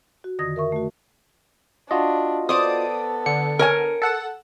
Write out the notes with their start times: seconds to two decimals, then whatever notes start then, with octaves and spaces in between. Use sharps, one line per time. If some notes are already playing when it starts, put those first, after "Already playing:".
0.24 F#4
0.39 F2 D3 D#3 D#6 A#6
0.56 A#4 E5 C#6
0.72 A3 F#4
1.91 D4 F4 F#4 D#5
2.49 B3 A4 C5 D5 D#6 D7 D#7
3.26 D3 C#7
3.59 A#4 C#5 G#5
4.02 A4 F#5 E7